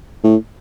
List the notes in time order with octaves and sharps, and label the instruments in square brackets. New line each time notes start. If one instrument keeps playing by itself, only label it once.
[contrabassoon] A2